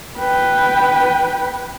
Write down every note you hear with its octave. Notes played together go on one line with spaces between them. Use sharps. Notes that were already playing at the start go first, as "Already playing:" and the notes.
B4 G5